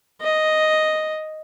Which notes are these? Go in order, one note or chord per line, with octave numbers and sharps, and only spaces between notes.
D#5